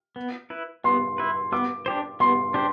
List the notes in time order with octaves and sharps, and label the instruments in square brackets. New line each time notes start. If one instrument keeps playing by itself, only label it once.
[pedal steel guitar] B3
E4 B4
[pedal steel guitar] B3 [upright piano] C6
[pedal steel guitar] E4 B4
[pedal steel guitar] B3 [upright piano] D6
[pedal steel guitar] D4 G4 C5
[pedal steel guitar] B3 [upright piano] C6
[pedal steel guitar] D4 G4 C5